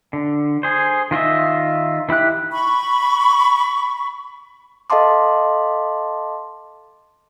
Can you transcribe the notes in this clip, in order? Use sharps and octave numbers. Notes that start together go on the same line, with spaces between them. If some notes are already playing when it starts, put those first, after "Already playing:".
D3
G#4 C5
D#3 F4 D#5 E5
D#3 E4 G4 F#6
B5 C#6
A4 D#5 F5 A5 C6 D6